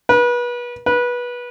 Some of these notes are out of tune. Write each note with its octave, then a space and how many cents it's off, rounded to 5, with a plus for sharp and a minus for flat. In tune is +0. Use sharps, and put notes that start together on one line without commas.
B4 -30
B4 -20